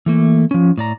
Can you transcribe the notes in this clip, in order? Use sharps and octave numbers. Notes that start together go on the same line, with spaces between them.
E3 A3 A#3
F3 C#4
A2 D5 A#5